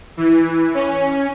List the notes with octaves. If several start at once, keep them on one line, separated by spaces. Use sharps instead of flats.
E3
C#4